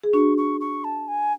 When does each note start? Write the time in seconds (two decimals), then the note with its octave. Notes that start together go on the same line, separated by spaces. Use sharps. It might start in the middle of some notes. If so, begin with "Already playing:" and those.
0.03 G#4
0.13 D4 F#4 C#6
0.38 C#6
0.61 C#6
0.84 A5
1.08 G#5